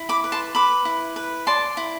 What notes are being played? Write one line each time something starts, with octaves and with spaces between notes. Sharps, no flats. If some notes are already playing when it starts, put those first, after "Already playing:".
Already playing: E4
B5 D6
B4
A5 C6
B4 B5 D6
E4
B4
D5 A5 C6
E4